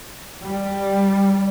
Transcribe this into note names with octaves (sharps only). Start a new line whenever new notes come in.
G3